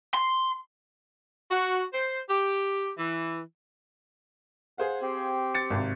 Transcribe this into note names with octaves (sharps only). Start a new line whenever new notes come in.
C6
F#4
C5
G4
E3
G#4 C5 F5 F#5
C4 G4
A6 C#7
G#1 C3